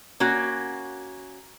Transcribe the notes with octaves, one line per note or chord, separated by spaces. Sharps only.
A#3 C#4 F#4